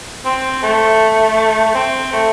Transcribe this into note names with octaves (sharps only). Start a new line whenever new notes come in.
C4
A3
A3
C4
A3